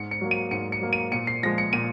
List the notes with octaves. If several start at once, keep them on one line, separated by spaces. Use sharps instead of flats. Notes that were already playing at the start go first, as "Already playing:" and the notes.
Already playing: G#2 C#7
C#7
F#3 A#3
D#7
G#2 C#7
C#7
F#3 A#3
D#7
A#2 C#7
C7
F3 G#3 A#6
C#7
A#2 D#7